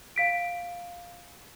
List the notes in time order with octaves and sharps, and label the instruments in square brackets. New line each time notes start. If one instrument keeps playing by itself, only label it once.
[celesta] F5 B6 D7